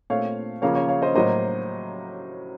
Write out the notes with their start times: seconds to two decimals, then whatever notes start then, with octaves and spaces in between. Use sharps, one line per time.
0.10 A#2 A3 C4 C#5 F5
0.62 C#3 F3 A#3 C#5 F5
0.75 C#5 F5
0.89 C#5 F5
1.02 C5 D#5
1.15 A2 F#3 A#3 C5 D#5